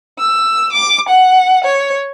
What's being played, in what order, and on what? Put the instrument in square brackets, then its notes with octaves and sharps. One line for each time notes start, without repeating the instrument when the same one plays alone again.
[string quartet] E6
D6
F#5
C#5